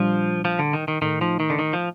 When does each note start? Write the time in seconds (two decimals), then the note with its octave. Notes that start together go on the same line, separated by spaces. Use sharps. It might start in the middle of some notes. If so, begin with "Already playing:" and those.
Already playing: A#2 F3 G3 D4
0.45 F3
0.59 D3
0.73 D#3
0.88 D#3
1.02 A2 D#3 A3 D#4
1.21 F3
1.40 D#3
1.50 D3
1.59 D#3
1.73 F3